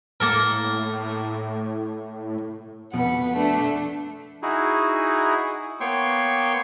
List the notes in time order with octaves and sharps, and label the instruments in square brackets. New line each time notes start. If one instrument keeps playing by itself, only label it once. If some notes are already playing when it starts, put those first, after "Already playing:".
[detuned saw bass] A2 [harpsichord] A#3 A4 A#4
[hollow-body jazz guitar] F2 B2 [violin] B4 F#5
[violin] A3 D4
[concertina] D#4 E4 F#4 G#4
A#3 B3 C#5 G5 C6 C#6